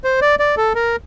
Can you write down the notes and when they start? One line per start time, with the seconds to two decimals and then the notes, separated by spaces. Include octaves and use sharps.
0.04 C5
0.22 D5
0.39 D5
0.57 A4
0.75 A#4